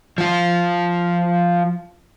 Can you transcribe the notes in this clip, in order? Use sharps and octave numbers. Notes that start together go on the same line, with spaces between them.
F3 F4